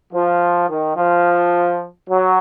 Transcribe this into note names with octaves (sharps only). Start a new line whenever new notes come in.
F3
D#3
F3
F#3